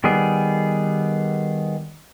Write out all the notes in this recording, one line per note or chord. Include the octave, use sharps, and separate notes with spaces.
D#3 G3 B3 G#4